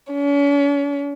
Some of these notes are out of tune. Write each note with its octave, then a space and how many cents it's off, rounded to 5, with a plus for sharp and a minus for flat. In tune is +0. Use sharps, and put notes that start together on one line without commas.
C#4 +40